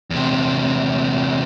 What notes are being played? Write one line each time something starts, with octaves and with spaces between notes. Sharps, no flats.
E2 C3